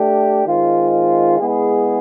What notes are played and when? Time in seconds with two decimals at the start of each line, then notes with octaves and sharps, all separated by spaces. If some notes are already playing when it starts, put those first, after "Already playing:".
Already playing: A3 D4 G4
0.46 D#3 G#3 C4 F4
1.39 G#3 B3 E4 G#4